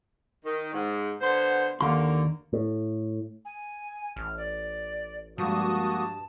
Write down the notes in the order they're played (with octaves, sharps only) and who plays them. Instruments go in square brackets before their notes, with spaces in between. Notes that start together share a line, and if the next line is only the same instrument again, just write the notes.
[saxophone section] D#3
G#2
D3 B3 C5
[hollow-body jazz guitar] D#2 C6 [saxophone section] D3 A#3
[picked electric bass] A2
[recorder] G#5
[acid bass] A1 [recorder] F6
[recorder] D5
[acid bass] G2 [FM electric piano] F3 G3 G#3 [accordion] A#3 F#4 D#6 [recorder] A5